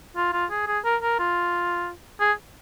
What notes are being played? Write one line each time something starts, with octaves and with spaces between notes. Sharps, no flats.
F4
F4
G#4
G#4
A#4
A#4
F4
G#4